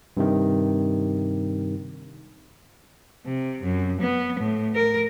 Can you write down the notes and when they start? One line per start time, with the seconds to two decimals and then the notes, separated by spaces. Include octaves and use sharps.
0.17 G2 C3 D#3
3.26 C3
3.63 F#2
4.01 B3
4.40 A2
4.75 A#4